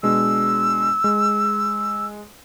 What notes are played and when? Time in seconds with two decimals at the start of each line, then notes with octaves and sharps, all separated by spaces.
0.03 B2 G#3 D4 E6
1.04 G#3